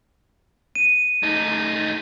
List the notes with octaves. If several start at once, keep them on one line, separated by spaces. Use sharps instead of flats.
D#7
A3 D#4